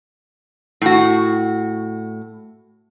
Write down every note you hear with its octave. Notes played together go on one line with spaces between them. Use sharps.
A2 F#4